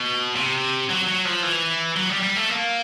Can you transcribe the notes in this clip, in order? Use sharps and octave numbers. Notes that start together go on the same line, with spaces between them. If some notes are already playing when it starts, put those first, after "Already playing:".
Already playing: B2
C3
F#3
F#3
F3
E3
F#3
G3
G3
A3
A#3